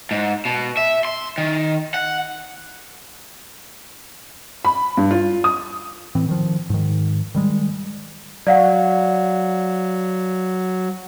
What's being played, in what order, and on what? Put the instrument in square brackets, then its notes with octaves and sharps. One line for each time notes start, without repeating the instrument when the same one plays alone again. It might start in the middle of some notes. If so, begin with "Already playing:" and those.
[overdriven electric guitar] G#2
B2
E5
C6
D#3
F#5
[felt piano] B5
G2
F4
D#6
[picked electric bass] A2 E3 C4
D#3 F3
G#2 D#3
D#3 G3 G#3
[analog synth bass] F#3 [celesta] D5 F5 F#5